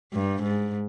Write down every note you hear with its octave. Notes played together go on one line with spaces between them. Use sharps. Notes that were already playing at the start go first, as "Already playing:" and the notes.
G2
G#2